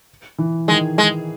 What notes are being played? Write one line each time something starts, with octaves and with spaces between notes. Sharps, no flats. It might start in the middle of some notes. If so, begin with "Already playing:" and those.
E3
D#3 G#3
G#3